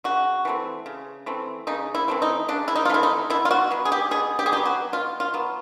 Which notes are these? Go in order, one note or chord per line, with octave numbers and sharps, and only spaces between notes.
C#3 F#4
E3 A3 C4
C#3
E3 A3 C4
C#3 D#4
E4
E3 A3 C4
D#4
C#3 D4
E4
D#4
F4
E3 A3 C4 E4
D#4
B2 E4
F4
F#4
F#3 B3
G#4
G4
B2 G#4
G4
G#4
F#3 B3 G4
F#4
B2 F4
F4
F#3 B3